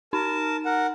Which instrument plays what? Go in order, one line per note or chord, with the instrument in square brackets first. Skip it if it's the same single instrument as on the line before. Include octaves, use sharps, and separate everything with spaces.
[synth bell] D#4 [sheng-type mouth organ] A#4 A5
[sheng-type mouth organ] A#4 F#5